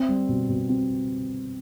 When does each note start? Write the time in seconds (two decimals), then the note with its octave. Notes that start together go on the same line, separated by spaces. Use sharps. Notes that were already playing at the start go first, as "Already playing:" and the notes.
Already playing: C4
0.09 G3
0.29 B2
0.49 B2
0.69 C4